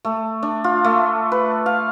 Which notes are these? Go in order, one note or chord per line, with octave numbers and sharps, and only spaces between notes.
A3
D4
F4
A3
B4
F5